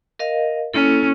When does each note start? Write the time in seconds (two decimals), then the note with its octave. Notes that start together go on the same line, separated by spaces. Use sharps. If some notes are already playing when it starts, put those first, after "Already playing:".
0.19 A#4 D#5 F5
0.74 A#3 C#4 E4 A4